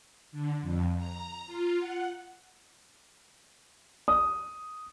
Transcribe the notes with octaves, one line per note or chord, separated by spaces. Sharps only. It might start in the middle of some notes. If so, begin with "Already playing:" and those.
D3
F2
A#5
F4
F#5
D#6